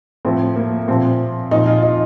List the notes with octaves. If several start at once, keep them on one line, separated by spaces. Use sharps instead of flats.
A2 F3 C4
A#3
A#2 F3 C4
A#2 F3 D#4
F4
D#4